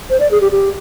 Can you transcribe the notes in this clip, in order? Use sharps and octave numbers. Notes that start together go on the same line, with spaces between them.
C5
D5
G#4
G4
G4